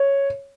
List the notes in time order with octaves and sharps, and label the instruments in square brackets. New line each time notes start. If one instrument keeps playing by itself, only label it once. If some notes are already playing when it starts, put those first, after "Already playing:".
Already playing: [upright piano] C#5